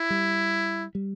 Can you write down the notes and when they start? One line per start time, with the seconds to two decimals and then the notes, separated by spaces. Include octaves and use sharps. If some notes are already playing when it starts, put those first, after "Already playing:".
Already playing: E4
0.10 G3
0.95 G3